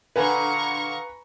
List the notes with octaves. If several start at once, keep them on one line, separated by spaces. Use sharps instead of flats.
A#2 D3 B4 G#5 A#5 B5 C#6